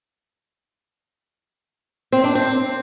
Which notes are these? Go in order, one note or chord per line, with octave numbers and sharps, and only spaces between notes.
C4
D4
C4